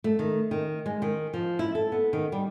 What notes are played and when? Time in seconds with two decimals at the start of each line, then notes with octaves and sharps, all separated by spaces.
0.04 A3
0.19 D#3
0.51 D#3
0.86 G#3
1.02 D#3
1.34 F3
1.59 E4
1.75 A4
1.92 B3
2.13 D#3
2.32 G3